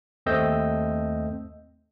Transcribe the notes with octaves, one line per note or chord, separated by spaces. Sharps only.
D#2 A3 C4 D#5 E6 G6